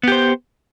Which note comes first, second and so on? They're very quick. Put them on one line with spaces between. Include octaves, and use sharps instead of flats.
B3 G4 C5